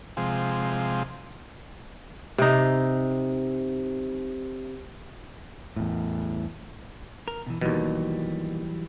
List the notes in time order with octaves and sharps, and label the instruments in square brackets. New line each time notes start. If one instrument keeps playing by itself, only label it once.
[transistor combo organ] C3 F3 G#3
[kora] C3 D#4
[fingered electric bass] E2 A2
[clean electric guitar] A#4
B2 E3
[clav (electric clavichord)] D#2 B2 [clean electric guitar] E3 F#3 G3